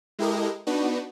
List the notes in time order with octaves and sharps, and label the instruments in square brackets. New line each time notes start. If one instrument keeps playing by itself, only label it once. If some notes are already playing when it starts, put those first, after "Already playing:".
[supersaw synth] G#3 E4 G4 A4 A#4 D#5
B3 D4 D#4 F#4 B4